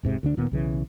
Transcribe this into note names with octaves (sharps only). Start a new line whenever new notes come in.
E1 G#2 C3
D2 D3 D4
D1 A#2 D#3 B3
B1 C#3 E3